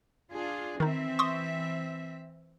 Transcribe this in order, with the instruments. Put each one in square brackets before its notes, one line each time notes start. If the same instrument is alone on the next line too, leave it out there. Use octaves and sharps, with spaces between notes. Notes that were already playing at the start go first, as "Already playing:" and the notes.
[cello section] D4 F4 G#4
[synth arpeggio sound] D#3 D#4 [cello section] E3 C4 E5
[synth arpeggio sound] C6 C#6 D#6